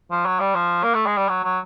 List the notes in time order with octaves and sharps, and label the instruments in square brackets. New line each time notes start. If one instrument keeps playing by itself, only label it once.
[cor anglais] F3
F#3
G3
F3
A#3
A3
G#3
G3
F#3
F#3